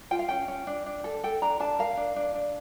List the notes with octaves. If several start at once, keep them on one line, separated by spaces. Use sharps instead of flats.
F4 G5
F5
C#4 G5
C#4
D4
D4
A4
A4 G5
D4 A#5
D4 A5
A#4 F5
D4
D4
D4